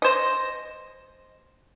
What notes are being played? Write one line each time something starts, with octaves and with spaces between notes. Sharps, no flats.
C5 D#5